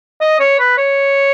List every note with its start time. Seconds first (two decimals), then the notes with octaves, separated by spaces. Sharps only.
0.21 D#5
0.40 C#5
0.59 B4
0.78 C#5